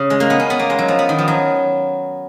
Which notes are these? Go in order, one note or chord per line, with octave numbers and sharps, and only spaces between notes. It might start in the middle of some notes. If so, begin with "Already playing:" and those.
Already playing: C#3
G#3
A#3
B3
C#4
B3
A#3
G#3
F#3
F3
B3
D#3
F3
F#3